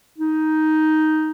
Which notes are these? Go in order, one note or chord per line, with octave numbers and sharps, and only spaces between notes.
D#4